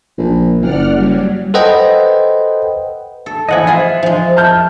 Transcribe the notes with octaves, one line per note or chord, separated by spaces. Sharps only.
A#1
F#1 D5 F#5 F6
F#3 G3
A4 B4 C5 D#5 F#5 G5
A4
E3 F3 E4 D#5 F#5 G#5
F4 G#4 E5 F#5
F3 G#3
A5 F6 G6